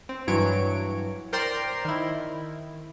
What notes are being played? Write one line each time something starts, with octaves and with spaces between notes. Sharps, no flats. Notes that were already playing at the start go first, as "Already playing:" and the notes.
C4
G2 E3 F#3 C#5 D7
A#4 C5 D5 G5 A#5 C6
D#3 E4